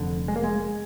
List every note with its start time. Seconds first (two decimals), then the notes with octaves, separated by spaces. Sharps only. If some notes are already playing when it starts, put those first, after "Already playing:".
Already playing: F1 F2 D3
0.28 G#3
0.36 A#3
0.44 G#3